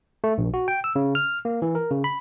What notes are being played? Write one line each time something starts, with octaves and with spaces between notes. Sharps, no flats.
A3
A#1
F#4
G5
E6
C#3
F6
A#3
E3
A#4
C#3
B5